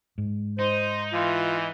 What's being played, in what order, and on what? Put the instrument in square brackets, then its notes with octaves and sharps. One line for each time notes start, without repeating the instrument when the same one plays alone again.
[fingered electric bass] G#2
[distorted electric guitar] D#4 [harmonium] C5
[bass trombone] E3 [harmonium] F4